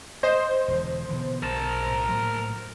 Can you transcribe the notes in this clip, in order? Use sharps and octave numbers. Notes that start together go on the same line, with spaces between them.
C5 D#5
E1 D3
B2 D3 E3
B1 A#4 A5
B1 A2
A2 F#3 A#3